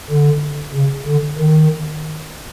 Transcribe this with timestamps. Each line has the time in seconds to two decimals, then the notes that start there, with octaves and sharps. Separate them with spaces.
0.10 D3
0.74 C#3
1.07 D3
1.38 D#3